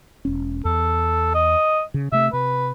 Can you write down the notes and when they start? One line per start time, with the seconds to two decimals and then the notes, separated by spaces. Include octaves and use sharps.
0.25 E1 C#4
0.65 E2 A4
1.34 D#5
1.94 C#3
2.12 C3 A3 E5
2.33 C3 B4